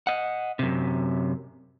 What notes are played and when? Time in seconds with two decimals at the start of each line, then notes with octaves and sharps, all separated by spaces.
0.07 D#5 F#5
0.59 F#2 C3